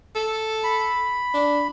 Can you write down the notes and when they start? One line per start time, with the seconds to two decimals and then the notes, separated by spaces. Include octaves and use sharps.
0.15 A4
0.64 B5
1.34 D4